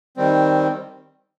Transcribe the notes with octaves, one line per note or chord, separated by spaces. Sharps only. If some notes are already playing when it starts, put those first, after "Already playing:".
D#3 G3 C4